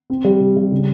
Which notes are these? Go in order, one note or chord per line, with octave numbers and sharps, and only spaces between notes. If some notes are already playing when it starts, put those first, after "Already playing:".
C4
G3
C3
G3
C#3